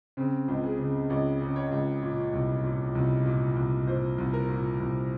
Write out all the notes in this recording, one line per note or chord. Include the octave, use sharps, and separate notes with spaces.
C#3 C4
C#2
G#4
C#3
C#2 C#5
C#3
C#5
C#2
A#2
C2
A#2
C2
A#2
C2
A#2 C5
C2
A#4
A#2
C2